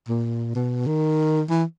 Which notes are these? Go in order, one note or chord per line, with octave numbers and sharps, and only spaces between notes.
A#2
B2
D#3
E3